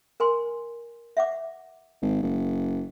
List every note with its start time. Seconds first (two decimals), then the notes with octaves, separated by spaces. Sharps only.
0.20 A#4 G#5 C6
1.17 E5 F#5 D6
2.02 G#1
2.22 F#1